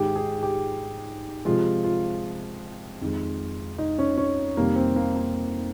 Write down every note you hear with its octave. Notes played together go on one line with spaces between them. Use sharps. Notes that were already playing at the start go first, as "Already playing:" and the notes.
Already playing: G#2 D#3 G#3 G4
G#4
G4
C3 F3 G#3 F4
F4
F2 D#3 G#3
D#4
C#4
C#4
F2 C3 D#3 G3 A#3
C4
A#3
A#3